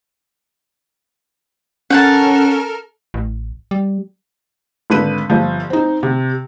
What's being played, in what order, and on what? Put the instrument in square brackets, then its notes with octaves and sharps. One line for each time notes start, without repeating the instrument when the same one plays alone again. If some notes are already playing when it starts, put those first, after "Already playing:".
[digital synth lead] C#4 [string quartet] A4 A#4 [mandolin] F#5 G5 A5
[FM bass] A1
G3
[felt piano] G#1 D3 B4 D#7
G1 F3
C4 D#4
C3